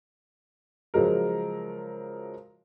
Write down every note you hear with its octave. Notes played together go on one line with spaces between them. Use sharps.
C#3 F3 F#3 G#3 A#4